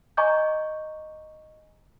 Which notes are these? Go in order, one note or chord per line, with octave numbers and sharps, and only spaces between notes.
D#5 G#5 A#5 C#6 D6 G6